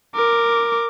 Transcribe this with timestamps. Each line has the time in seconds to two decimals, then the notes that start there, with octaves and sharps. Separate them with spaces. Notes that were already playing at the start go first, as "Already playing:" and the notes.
0.15 A#4 D6